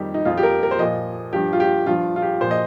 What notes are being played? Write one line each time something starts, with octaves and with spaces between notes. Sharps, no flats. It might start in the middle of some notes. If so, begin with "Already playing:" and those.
Already playing: F2 D#3 G3 G4
D#4
F2 F3 F4
G4
A#4
A#4
C5
A#2 F3 D#5
G2 F3 G4
F4
G4
G2 F3 F4
F4
G4
A#2 F3 C5
D#5